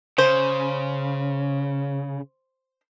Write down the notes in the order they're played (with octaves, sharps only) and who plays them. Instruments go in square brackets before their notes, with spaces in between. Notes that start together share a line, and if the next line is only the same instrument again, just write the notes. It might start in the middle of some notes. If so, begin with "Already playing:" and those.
[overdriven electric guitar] C#3 [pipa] C5